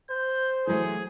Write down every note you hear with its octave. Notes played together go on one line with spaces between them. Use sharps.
C5 G6
E3 F#3 A3 G#4